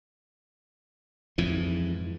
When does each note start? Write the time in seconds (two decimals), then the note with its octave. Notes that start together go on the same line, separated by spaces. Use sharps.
1.38 F2 G#2 E3